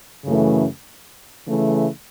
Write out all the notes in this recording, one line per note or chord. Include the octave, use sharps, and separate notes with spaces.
F#2 C#3 E3 A3 C#4
C#3 E3 A3